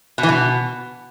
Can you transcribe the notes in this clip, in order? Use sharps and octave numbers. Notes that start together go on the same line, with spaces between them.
B2
E3
B2